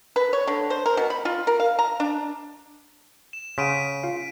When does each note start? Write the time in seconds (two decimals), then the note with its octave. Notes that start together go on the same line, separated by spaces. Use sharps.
0.16 B4
0.33 C#5
0.47 D3
0.70 C5
0.86 A#4
0.97 B2
1.10 B5
1.25 F4
1.47 A#4
1.60 F5
1.79 A#5
2.00 D4
3.33 E7
3.58 C#3 F#5 C6 B6 D7 D#7
4.04 F4 F5